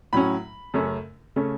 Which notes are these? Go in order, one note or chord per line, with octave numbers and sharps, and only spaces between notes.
A2 F#3 C#4 B5
F#2 C#3 A3 C#4
C#3 A3 C#4